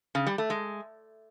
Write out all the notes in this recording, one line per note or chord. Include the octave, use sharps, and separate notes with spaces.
C#3
G3
A3
G#3